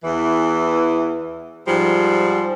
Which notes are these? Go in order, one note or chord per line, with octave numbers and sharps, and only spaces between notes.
E2 E3
G#2 F3 G3